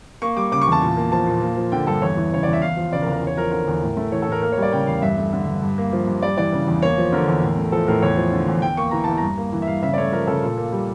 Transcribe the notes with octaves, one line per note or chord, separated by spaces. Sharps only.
A#3 C#6
G3 D6
C#3 D6
C#6
E2 A5
A#2
A#3
F3 A5
A#2
A#3
F3
D3 G5
G2 A4
E2 C#5
E3
C#3 C#5
E2 D5
E5
E2 F5
F3
C#3 D5
A#4
E2
A#4
E2 C#5
F3 A#4
D3 A#4
E2
A2
A3
E3 C#5
A4
A2 A#4
A#3 A#4
C#5
G3 D5
C#3 G5
E2 F5
G2 E5
A3
D3
G2
G2
A#3
F3
G2
G3 D5
E3 D5
C#3
E2
A#3 C#5
F3
D3 A#4
E2
A2
A3
F3 A4
A2 A#4
E2 C#5
F3
D3
E2
E2 G5
A#3 C#6
E3 A#5
E2 A5
G2 A#5
A#3
E3
E5
G2 F5
C#3 E5
D5
A3 C#5
F3 A#4
C#3 A4
A#2
A#3
G3